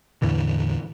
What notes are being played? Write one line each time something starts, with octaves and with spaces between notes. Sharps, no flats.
E2 A2 D3 E3